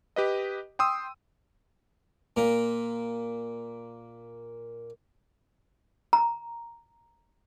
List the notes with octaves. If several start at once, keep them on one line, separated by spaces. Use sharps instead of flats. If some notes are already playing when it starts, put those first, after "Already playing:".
G4 B4 D#5
G5 C6 D#6 E6
A#2 A#3
A#5